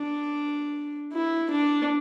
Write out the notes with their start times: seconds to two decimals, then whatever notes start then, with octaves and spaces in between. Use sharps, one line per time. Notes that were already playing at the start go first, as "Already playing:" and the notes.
Already playing: D4
1.13 E4
1.50 D4